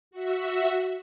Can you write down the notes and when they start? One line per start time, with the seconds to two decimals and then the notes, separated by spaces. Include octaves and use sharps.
0.11 F#4 E5